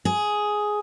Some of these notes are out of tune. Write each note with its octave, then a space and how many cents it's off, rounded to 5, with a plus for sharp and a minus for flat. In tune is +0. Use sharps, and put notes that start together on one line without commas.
G#4 +5